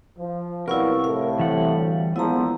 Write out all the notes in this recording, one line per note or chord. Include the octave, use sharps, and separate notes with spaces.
F3
C3 F#3 G3 B3 E4 A#4 F5 C#6
A2 F5
E3 G3 F#5
D2
A#1 F3 G#3 B3 E4 A#5